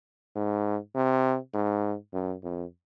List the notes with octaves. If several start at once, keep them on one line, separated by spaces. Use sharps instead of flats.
G#2
C3
G#2
F#2
F2